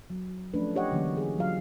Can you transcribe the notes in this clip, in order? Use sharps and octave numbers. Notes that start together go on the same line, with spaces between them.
F#3
F3 A3 C#4 D4 B4
G4 C#5 D#5 F#5
D3 E3 F#3 A#3 C#4
G#4
F#3 G3 F4 F5